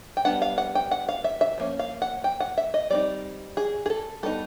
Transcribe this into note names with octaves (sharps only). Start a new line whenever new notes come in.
G5
G3 B3 D4 F#5
F5
F#5
G5
F#5
F5
E5
E5
F3 A#3 C#4
F5
F#5
G5
F#5
E5
D#5
G3 C4 D#4 D5
G#4
G#4
A4
G3 B3 D#4 A4